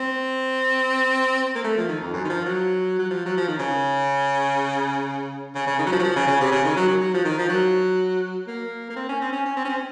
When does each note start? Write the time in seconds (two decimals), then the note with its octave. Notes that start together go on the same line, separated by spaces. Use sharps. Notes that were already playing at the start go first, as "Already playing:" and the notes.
Already playing: C4
1.55 A#3
1.64 A3
1.77 F3
1.89 D#3
2.01 F2
2.14 F#2
2.25 D#3
2.30 F3
2.46 F#3
2.99 F#3
3.11 F3
3.26 F#3
3.37 F3
3.48 D#3
3.59 C#3
5.55 C#3
5.67 C#3
5.79 D#3
5.86 F#3
5.92 F3
5.99 F#3
6.03 F3
6.16 C#3
6.28 C#3
6.41 C3
6.52 C#3
6.65 D#3
6.76 F#3
6.88 F#3
7.01 F#3
7.14 F3
7.25 D#3
7.38 F3
7.49 F#3
8.47 A#3
8.90 A#3
8.96 C4
9.09 C#4
9.21 C4
9.32 C#4
9.46 C#4
9.57 C4
9.65 C#4
9.69 C4